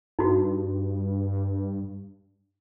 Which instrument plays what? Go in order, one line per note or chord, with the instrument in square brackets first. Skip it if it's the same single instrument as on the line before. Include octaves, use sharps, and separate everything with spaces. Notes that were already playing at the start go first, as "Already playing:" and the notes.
[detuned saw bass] G2 [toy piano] D#4 F#4